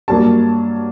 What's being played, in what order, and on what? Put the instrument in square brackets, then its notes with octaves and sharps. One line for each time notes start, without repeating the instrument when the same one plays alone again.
[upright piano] G2 F#3 A#3 A5